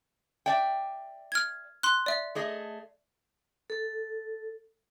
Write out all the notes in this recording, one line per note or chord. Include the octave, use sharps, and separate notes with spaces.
D5 E5 G5
F6 G#6
C6 F#6
D5 E5
A3 G#4 D#5
A4